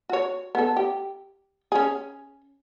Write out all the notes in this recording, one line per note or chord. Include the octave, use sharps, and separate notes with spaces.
F#4 C#5
B3 A4
G4
C#4 G#4